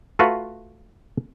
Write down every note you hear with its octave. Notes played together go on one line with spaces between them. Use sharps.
A3 F4 F#4 B4